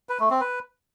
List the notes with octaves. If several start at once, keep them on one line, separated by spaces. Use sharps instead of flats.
B4
A3
C4
B4